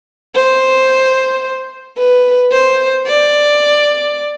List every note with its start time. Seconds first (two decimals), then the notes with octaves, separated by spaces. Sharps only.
0.35 C5
1.98 B4
2.52 C5
3.07 D5